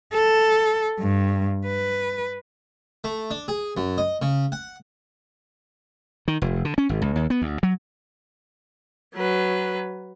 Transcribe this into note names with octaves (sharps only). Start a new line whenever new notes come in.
A4
G2
B4
A3
D4
G#4
F#2
D#5
C#3
F#5
D#3
F1
D3
C#4
G#1
C#2
D#2
B3
D2
F#3
F#3 B4